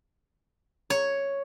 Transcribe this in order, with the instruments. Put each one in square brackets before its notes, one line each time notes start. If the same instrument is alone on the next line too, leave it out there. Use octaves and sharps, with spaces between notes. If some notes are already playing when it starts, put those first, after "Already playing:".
[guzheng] C#5